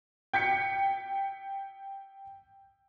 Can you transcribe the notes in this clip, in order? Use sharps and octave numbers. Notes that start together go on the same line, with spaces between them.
G5 G6 B6 C#7